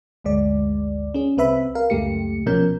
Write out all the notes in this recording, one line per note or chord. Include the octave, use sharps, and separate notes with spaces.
G1 D2 G#3 D5
C#4 G#4
C2 C4 B4 E5 B5
A#4 F5
C#2 F#2 A3 G4 C#7
C2 B2 F3 C#4 A#4 G6